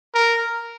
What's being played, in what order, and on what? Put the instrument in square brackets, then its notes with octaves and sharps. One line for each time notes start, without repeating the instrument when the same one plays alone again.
[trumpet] A#4